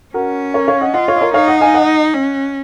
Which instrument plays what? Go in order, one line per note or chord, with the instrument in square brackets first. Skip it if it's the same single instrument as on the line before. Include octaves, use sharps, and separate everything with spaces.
[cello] C#4 [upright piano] F#4 A#4
[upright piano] A#4 C#5
C#5 F5
D#5 F#5
[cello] F4 [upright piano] D#5 F#5
[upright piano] C#5 F5
D#5
A#4 C#5
[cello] D#4 [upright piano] C#5 F5
[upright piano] D#5 F#5
F5 G#5
D#5 F#5
[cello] C#4